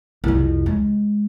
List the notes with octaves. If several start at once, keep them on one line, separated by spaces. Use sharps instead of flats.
C2 F2
G#3